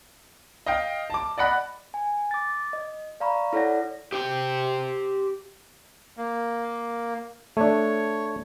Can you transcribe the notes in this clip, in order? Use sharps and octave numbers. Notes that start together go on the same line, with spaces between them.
D#5 F5 G5
A5 D6
D5 D#5 F#5 B5 F#6
G#5
D6 A6
D#5
D5 F5 A#5 B5 C#6
E4 A4 C#5 D5 F#5 A#6
G4 C5 G5
A#3
A3 D4 C#5